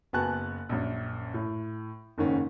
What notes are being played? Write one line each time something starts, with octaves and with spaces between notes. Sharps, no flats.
F#1 B3 F#4 G#5 A5 F#6
A#1 F#2
A2
F#1 G#2 D#3 C#4